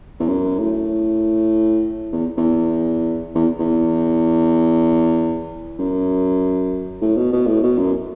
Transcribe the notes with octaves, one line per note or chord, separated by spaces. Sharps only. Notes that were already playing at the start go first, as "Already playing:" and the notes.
E2
F#2
A2
E2
E2
E2
E2
F#2
A2
B2
B2
A2
B2
F#2